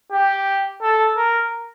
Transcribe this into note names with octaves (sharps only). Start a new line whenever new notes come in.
G4
A4
A#4